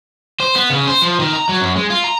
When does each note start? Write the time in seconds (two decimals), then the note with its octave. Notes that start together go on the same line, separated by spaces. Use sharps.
0.40 C5
0.56 B3
0.70 C#3
0.87 C5
1.02 F3
1.20 D#3
1.33 A#5
1.49 F#3
1.61 F#2
1.76 G#3
1.90 F4
2.04 A#5